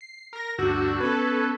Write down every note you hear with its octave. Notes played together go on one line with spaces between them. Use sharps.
C7
A#4 A#6
D2 G2 D4 F#4 E6
B3 C#4 A4 B4